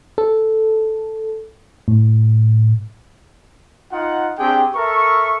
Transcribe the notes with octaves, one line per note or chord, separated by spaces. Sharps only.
A4
A2
D#4 F4 F#5
C4 D4 G4 G#4 G5
A4 A#4 E5 C#6